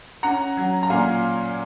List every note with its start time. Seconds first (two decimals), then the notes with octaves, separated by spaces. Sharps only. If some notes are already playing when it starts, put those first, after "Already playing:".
0.23 C#4 F#5 A#5
0.57 F#3
0.83 A#5
0.90 A#2 F5 G#5